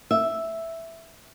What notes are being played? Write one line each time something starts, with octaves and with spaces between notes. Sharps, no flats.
E5